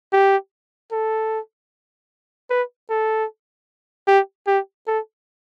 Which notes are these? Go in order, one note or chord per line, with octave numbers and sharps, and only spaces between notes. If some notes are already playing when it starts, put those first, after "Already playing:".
G4
A4
B4
A4
G4
G4
A4